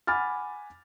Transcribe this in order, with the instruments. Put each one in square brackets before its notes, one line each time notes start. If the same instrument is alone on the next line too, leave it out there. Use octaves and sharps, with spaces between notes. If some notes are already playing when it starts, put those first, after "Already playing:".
[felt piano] F#5 G#5 B5 D6 F6 A6